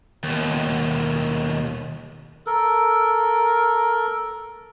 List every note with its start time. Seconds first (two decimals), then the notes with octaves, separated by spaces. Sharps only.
0.24 D#2 B2
2.46 A4 A#4